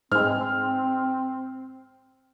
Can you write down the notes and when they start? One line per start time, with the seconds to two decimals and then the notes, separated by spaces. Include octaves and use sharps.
0.12 G#2 G#3 C4 F6